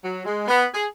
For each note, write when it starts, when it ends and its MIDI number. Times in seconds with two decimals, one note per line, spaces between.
0.04 0.25 54
0.26 0.45 56
0.48 0.66 59
0.74 0.86 68